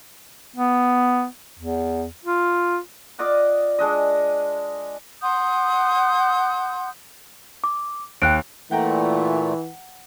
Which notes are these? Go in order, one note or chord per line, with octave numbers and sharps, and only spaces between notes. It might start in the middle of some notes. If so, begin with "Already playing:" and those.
B3
E2
F4
F4 D5 D#5 F#5
G#3 D4 D#5
F#5 C6 D#6 G6
D6
D#2 G5 F#6 D7
A#2 E3 A3 F#5 G5 A#5